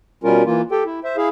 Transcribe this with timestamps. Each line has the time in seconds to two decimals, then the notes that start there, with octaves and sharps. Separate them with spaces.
0.24 B2 G3 C#4 F4 A#4
0.46 E3 A#3 F4
0.71 G4 A4 G5
0.85 E4
1.04 C5 E5
1.17 E4 G#4 F5